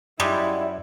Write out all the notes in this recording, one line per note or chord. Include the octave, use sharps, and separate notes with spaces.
F#2 G3 G#3 E4